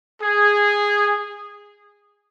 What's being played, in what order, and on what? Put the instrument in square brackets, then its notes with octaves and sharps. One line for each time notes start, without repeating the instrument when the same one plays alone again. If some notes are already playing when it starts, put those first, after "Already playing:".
[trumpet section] G#4